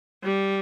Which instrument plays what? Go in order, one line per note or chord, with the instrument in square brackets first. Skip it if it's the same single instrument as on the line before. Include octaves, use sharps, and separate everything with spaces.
[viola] G3